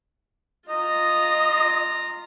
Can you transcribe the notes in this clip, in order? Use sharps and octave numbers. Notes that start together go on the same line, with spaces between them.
F4 D#5 A#5